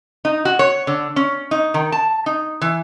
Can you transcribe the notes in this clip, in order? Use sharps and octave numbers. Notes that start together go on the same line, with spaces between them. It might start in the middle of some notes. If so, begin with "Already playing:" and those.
D#4
F#4
C#5
D3
C#4
D#4
D#3
A5
D#4
E3